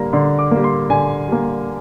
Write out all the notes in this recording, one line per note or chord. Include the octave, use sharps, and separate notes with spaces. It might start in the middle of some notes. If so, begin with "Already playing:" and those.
Already playing: D3 G3 A#3 A#5
D3 C6
D6
G3 A#3
C6
D3 G#5
G3 A#3